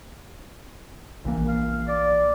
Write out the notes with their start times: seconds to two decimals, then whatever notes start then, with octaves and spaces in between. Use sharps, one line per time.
1.25 A#1 E3 A#3
1.48 F5
1.88 D5